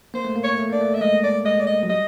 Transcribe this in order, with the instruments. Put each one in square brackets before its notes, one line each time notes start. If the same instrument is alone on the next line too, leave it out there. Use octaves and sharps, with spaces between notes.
[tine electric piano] A#3 [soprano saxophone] C5
[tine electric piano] A3
A#3
[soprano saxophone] C#5
[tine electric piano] A3
[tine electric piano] A#3 [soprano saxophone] D5
[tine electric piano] A3
[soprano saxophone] E5
[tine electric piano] G#3 [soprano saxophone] D#5
[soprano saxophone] D5
[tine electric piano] G#3 [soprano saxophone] D#5
[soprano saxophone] D5
D#5
[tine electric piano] F#3
[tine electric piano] G3 [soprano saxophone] D#5